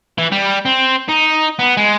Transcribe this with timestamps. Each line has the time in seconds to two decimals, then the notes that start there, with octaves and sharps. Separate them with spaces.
0.18 E3
0.32 G3
0.65 C4
1.09 D#4
1.59 B3
1.77 G#3